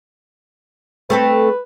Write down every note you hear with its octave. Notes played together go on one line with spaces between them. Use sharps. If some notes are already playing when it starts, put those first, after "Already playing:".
A3 C4 A4 B4